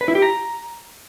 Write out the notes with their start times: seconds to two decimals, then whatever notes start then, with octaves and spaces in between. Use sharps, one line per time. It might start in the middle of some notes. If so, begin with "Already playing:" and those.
0.01 B4
0.08 E4
0.15 G4
0.22 A#5